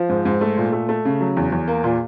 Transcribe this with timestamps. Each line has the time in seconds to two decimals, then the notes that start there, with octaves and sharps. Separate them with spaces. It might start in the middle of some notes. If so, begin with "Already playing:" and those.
Already playing: F3
0.09 G#2
0.25 G#2
0.41 A3
0.57 A#2
0.73 A3
0.89 A3
1.05 C#3
1.21 F#3
1.37 E2
1.52 E2
1.68 A#3
1.84 A#2